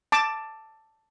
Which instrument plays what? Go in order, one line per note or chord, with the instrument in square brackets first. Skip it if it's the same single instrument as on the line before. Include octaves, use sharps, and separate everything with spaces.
[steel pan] A5 D6